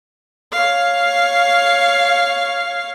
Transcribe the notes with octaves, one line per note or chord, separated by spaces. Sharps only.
C#5 F5